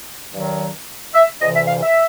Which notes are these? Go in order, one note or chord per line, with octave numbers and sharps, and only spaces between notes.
G2 D#3 F#3
E5
D2 C3 E3 D#5
E5
F5
E5